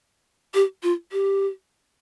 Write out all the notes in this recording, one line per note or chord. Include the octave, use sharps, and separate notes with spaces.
G4
F4
G4